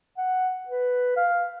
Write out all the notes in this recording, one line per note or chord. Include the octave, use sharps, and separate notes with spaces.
F#5
B4
F5